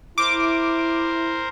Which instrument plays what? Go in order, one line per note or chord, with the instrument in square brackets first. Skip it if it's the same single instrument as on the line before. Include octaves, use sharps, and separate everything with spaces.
[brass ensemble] E4 [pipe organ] A#4 C5 [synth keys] D6